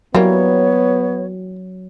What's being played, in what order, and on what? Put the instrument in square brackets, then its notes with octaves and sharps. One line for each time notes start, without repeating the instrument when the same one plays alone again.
[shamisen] E3 G3 A#3 [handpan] F#3 [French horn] B3 [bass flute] C#5